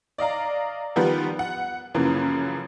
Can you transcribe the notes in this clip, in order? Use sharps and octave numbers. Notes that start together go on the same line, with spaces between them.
D5 D#5 F5 A#5
D#3 F3 G3 B3 A#4 B4
F#5
F#2 C#3 E3 F3 A#3